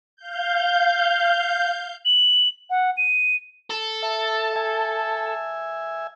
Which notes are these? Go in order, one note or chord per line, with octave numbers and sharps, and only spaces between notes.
F5 G6
F#7
F#5
D#7
A4
E5 A5
E5 G#5